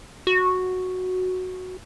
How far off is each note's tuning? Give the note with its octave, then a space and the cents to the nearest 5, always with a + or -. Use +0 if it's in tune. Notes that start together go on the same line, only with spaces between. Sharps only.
F#4 -5